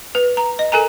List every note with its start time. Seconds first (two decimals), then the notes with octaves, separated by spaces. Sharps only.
0.15 B4
0.37 A#5
0.59 D#5
0.72 A4 A#4 G#5 A#5